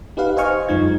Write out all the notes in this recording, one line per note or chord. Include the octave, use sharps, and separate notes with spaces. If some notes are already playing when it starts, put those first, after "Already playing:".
D#4 G4 B4 F5 F#5
C5 D#5 F5 G#5 C#6 F6
F#2 G#3 D#4 F4 G#6